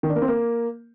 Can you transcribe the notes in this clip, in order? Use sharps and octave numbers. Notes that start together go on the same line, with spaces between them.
D#3
D4
A#3
C4
A#3